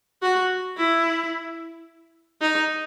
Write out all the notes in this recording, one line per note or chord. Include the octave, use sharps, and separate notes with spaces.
F#4
E4
D#4